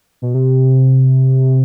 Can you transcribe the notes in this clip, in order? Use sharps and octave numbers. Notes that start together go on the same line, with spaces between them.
B2
C3